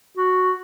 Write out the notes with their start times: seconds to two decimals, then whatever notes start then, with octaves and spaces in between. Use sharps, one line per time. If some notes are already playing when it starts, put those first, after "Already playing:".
0.18 F#4